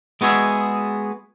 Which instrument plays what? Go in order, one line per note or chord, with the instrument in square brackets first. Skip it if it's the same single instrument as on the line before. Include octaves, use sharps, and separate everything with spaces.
[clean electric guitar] G#3 B3 F#4 G#4 E5